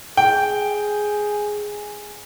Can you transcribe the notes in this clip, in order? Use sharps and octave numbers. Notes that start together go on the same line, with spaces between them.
G#4 G5